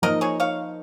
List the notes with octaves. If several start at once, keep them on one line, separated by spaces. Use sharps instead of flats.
F3 A#3 D#4 A#4 D#5
G#4 C#5
C#5 F5